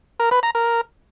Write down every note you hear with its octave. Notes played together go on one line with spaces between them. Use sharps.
A#4
B4
A#5
A#4